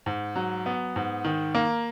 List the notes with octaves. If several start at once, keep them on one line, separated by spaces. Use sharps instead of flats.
G#2
F#3
B3
G#2
D#3
A#3